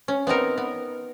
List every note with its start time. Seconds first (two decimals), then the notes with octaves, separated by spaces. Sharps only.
0.08 C#4
0.27 B3 C4 D#4 A#4
0.58 B3